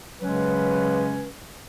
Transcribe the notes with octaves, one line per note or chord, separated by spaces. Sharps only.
C#3 F#3 G#3 C#4 B4